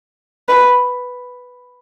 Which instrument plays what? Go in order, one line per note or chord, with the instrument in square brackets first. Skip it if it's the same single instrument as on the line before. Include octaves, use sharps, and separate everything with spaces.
[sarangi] B4